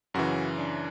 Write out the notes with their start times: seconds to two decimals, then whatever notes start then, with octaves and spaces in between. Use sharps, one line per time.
0.14 F#2 C#3 E3 F#4
0.58 D4